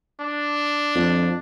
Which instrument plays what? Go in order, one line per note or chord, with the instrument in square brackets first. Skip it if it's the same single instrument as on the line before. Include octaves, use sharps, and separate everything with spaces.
[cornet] D4
[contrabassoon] F2